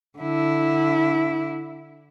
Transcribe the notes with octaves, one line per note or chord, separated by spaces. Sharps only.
D3 E4